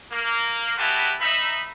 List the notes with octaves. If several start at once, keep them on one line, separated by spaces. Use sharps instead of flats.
A#3
G#3 E4 F#4 G4 B4 A5
D#4 E5 B5